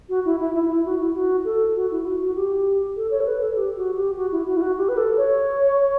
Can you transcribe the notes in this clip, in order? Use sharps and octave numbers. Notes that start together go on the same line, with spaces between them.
F#4
E4
E4
E4
E4
F#4
E4
F#4
A4
F#4
E4
F#4
F#4
G4
A4
C#5
A4
B4
A4
G4
F#4
G4
F#4
E4
F#4
E4
F#4
G4
B4
A4
C#5